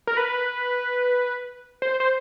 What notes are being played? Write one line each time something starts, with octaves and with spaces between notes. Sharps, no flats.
A#4
B4
C5
C5